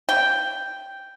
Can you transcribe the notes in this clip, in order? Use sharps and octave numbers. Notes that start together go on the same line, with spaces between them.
G5